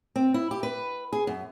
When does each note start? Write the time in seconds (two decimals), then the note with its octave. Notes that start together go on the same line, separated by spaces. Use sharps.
0.16 C4
0.34 E4
0.51 G4
0.63 B4
1.13 G#4
1.27 F#2